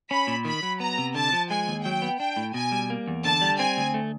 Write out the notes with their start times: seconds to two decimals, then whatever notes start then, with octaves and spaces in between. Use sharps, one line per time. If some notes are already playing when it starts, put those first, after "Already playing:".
0.11 C#4 B5
0.27 A#2
0.45 D#3 B5
0.63 F#3
0.80 B3 A#5
0.98 C3
1.15 D3 A5
1.32 F3
1.50 G#3 G#5
1.68 D#2
1.85 F#3 G5
2.02 B3
2.20 D4 G5
2.37 A2
2.54 B2 G#5
2.72 G3
2.90 A#3
3.07 E2
3.24 D3 A5
3.41 G3
3.59 C4 G#5
3.77 D2
3.94 A3